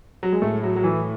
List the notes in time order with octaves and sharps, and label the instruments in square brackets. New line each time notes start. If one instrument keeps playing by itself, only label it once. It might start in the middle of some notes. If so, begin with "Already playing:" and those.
[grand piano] F#3
G#3
[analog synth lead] A2 [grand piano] A3
[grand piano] F#3
F#3
E3